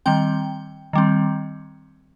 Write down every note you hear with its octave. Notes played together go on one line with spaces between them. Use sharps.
D#3 G3 C4 G5
D#3 G3 C4